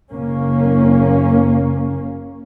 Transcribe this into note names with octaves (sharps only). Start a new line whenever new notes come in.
F#1 A#3 C#4